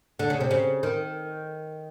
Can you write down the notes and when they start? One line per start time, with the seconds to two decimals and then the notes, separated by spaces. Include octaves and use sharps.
0.19 D3
0.30 C#3
0.40 C3
0.51 C#3
0.83 D#3